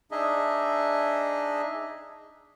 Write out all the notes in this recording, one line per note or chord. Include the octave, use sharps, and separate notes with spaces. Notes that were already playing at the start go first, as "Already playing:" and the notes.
D4 D#4 G#4 D#5 E5